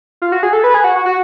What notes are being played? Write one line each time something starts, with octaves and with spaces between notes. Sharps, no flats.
F4
F#4
G#4
A4
B4
G#4
F#4
F#4
F#4